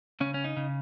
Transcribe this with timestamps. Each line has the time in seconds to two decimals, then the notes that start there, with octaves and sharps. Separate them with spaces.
0.20 C#3 C#4
0.34 C#4
0.44 D#4
0.57 C#3